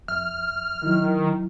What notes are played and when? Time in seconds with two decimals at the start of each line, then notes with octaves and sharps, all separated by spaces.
0.08 F2 E5 F6
0.82 D#3 F#3 E4